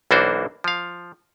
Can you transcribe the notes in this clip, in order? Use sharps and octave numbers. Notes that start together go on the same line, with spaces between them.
B1 E3 A#3 D4 F#4 C5
F3 F5